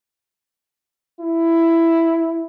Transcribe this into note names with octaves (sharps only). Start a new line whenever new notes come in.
E4